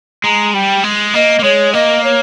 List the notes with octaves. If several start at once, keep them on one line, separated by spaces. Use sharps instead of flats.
G#3 A#5
G3 G5
G#3
A#3 D#5
A#3
G#3 C#5
A#3 D#5
C#5